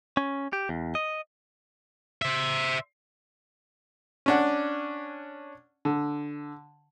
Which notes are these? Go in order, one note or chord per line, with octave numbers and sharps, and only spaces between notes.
C#4
G4
E2
D#5
C5 E5
C#4 D4 F#5
D3